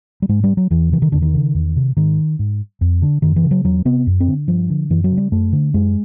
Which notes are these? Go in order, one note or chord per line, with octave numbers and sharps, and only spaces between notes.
G3
G#2 G#3
G3
F#3
E2 E3
C3 E3
D#3
E2 D3
D#3
C#3
E2
C3
G#2 D#3
G#2
F2
D3
F#2 D#3
E3
C#3
F#3
E2 F#3
C3 B3
F#2
C4
D3
G2 F3
D3
F#2 E3
F#3
C#3
G3
F#2 A3
D3
F#2 G#3